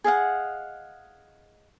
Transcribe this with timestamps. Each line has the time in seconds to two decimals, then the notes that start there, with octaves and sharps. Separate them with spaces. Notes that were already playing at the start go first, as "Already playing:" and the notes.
0.04 G#4 D#5 F5 F#5